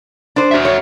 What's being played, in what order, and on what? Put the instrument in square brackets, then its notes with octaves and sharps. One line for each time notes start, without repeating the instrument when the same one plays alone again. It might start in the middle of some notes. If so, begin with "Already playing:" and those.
[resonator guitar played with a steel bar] D4 C5
[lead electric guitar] F#4 E5
[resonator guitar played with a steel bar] C#5